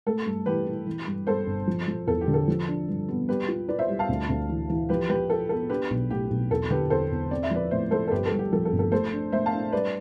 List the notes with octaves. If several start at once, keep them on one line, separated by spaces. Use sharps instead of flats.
A3 A4
G2
E3 G4 B4
E4
E3
G2
G2 A4 C5
G1
F3
F3
E2 A4
G4
D3
A4
F3
D4
G2
B3
G3 G4 B4
F4
F4 B4 D5
C5 E5
G3
F5 A5
D2
D2
E3
E3
F3 G4 B4
F3 G4 B4
F4 A4
B3 A4
D4 G4 B4
B1
A2 G4
B1
E2 A4
D3 G4 B4
E2 A4 C5
E2
C4 D5
E5
F3 B4 D5
A2 C5 E5
F3 A4 C5
A4
G1 G4 B4
A4
G2
G4
F3 A4
A4
G1
A4
A3 A4 C5
D4
A3 C5 E5
F5 A5
D4
G3 B4 D5